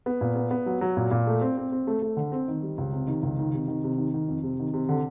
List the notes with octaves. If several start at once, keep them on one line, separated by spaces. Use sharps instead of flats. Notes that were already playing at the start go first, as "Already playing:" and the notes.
B3
A#2
B3
B3
F#3
F#3
A#2
A#2
A3
C4
C4
C4
A3
A3
D3
C4
D#3
G3
C#2
C3
D#3
C#2
D#3
C3
D#3
C3
D#3
D#3
F2
C3
D#3
C3
D3